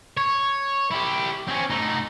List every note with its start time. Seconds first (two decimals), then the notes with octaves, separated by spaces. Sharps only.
0.17 C#5
0.92 E4 G4
1.48 C4 C#4
1.70 A3 D#4